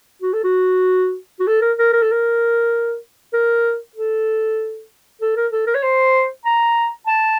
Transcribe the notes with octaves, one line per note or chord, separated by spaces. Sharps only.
F#4
A4
F#4
F#4
A4
A#4
A#4
A#4
A4
A#4
A#4
A4
A4
A#4
A4
A#4
C#5
C5
A#5
A5